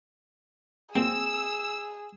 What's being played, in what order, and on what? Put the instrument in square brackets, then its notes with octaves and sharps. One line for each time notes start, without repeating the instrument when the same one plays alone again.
[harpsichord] A#2 F#3 G#3 [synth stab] C4 [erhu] G#4 [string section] E6